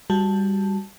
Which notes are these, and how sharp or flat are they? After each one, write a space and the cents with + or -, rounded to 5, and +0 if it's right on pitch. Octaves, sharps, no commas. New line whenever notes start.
G3 +10 F#4 +0 A5 +0